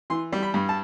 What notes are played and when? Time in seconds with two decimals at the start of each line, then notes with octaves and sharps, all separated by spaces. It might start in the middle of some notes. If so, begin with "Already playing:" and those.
0.10 E3 C6
0.32 G3
0.43 B5
0.54 G2
0.69 A5